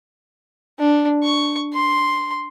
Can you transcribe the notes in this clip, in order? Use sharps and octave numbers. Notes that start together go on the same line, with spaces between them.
D4
C#6
C6